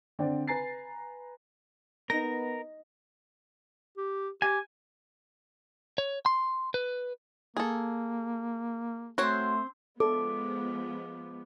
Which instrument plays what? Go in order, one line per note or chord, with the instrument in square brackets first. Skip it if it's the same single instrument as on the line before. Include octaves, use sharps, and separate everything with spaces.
[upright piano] D3 C4 D5
B4 G#5 A#5 A6 C7
[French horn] B3 [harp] D#4 [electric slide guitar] A#4 [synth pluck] A#6
[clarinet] G4
[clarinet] G4 [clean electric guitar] G#5
[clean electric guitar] C#5
C6
B4
[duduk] A#3 [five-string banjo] G#4 A4
[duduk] A3 [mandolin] C4 C5 C6 [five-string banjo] F#4 C#5
[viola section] F3 G#3 B3 [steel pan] A4 [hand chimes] D6